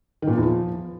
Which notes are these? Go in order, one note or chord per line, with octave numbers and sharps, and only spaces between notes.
D#3
A#2
F3
E2
F3